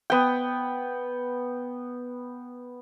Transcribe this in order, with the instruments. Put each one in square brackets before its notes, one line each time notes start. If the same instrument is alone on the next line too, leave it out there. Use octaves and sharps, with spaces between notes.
[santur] B3 G5